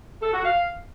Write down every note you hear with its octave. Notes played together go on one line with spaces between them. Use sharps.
A4
F#4
F5